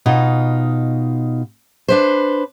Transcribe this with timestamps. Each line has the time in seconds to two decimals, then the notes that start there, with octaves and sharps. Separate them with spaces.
0.06 B2 D#4 F4
1.88 D4 B4 C5